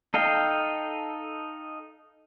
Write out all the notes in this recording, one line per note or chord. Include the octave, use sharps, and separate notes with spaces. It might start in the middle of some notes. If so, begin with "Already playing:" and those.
D#4 A4 D#5 F5 G5